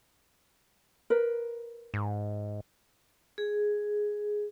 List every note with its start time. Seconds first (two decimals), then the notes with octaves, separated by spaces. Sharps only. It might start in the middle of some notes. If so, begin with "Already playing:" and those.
1.10 A#4 B4
1.94 G#2
3.38 G#4